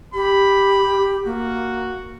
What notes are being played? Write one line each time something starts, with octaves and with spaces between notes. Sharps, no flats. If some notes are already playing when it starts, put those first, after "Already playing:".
G4 B5
A#3 F#4